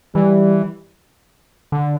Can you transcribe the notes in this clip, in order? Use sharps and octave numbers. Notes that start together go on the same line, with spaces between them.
E3 G3
D3